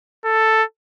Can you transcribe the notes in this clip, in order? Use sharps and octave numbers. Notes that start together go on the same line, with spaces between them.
A4